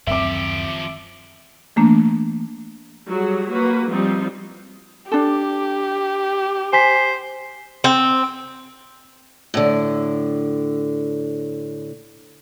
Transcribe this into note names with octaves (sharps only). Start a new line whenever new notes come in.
D1 F#2 D#3 F3 C4 G4 E5 D6
E3 A3 A#3 D4
F#3 G3 F#4 G#4
A#3 F#4 B4
F3 G3 C4 D#4
D4 G4 A4
C5 G#5 B6
C4
A2 D3